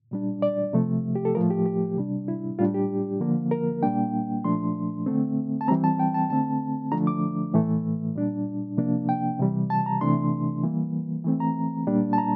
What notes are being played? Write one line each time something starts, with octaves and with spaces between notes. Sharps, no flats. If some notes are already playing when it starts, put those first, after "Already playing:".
A#2 G3 D4
D5
C3 F3 A3
G4
A4
A2 F3 A3 A#4
G4
G4
C3 G3 D4
E4
A2 G3 D4 F4
G4
D3 F3 A#3
A#4
A#2 G3 A#3 D4 G5
A#2 F3 A3 D4 C6
D3 A3 C4
A5
E3 G3 C4 A#5
A5
G5
A5
D3 A3 C4 A5
D3 F3 A3 D4 A#5
D6
A2 E3 A3
A#2 G3 D4
C3 F3 A#3 D4
G5
C3 E3 G3
A5
A#5
C3 E3 A3 D4 C6
E3 G3 A#3
E3 A3 C4
A#5
A#2 G3 A#3 D4
A5
A#5